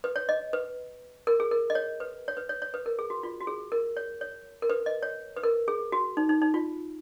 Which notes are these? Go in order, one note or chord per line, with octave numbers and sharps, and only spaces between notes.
B4
C#5
D#5
B4
A#4
G#4
A#4
D#5
C#5
B4
C#5
B4
C#5
C#5
B4
A#4
G#4
F#4
F4
F#4
G#4
A#4
C#5
C#5
A#4
B4
D#5
C#5
B4
A#4
G#4
F#4
D#4
D#4
D#4
F4